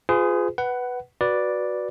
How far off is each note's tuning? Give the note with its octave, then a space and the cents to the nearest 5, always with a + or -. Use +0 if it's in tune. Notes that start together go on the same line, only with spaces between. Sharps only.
F4 +10 G#4 +0 B4 +45
B4 +0 F#5 +15
F#4 +0 B4 -10 D5 +0